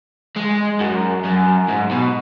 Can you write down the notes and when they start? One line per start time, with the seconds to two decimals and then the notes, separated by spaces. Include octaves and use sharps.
0.36 G#3
0.80 F#2
1.25 F#2
1.69 G#2
1.91 B2